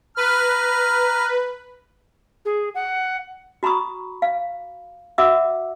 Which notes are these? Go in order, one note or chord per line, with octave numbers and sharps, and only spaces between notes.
B4 A#5 F6
G#4
F#5
F#4 A#5 B5 C#6 D#6
F5
F#4 E5 F#5 D6 E6